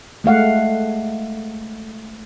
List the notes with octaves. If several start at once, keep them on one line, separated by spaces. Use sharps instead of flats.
G#3 A3 F5 F#5